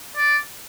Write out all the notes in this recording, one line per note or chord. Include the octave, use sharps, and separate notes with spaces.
D5